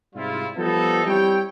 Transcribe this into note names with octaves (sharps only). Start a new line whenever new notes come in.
G#2 C3 G3 E4 F4
F3 G3 B3 D#4 A4
G3 C4 E4 C#5 G5